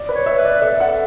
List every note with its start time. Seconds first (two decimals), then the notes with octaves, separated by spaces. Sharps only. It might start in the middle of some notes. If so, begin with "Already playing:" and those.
Already playing: D5
0.09 B4
0.15 C#5
0.26 E5
0.38 B4
0.45 D5
0.62 A4 E5
0.80 F#5